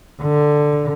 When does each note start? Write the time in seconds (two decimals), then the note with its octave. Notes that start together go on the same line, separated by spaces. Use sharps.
0.23 D3